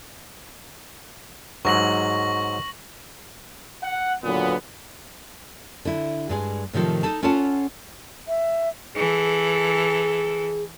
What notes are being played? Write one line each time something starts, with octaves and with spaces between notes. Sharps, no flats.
G#2 F#3 C#6 A#6 F#7
F#5
D#2 A#2 D3 F#3 B3
D3 E4
G2 G#3 G#4
A2 C3 D#3 F3 A4
D#4 A4 A5
C#4 F4 A4 C#5 F#5 A5
E5
E3 G#4 A4